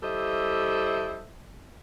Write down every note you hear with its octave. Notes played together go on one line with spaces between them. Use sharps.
G3 E4 A4 C5 D#5 E5